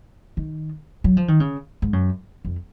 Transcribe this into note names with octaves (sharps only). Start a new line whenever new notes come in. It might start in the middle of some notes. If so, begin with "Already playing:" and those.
D#3
F#3
F3
D#3
C#3
G#2
F#2
F2